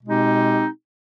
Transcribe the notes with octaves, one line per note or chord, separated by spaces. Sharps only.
B2 G#3 C4 D#4 G4